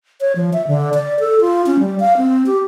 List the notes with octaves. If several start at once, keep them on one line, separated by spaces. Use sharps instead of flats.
C#5
F3
E5
D3
D5
A4
F4
C#4
G3
F5
C4
G4